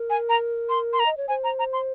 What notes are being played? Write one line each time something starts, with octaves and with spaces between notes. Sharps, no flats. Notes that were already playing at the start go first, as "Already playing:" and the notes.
Already playing: A#4
G#5
A#5
C6
C6
A#5
D#5
C#5
C5 G#5
A#5
A#5
C6